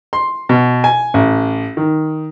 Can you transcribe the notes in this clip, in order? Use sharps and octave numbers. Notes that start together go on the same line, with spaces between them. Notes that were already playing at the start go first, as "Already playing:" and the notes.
C6
B2
G#5
A1
D#3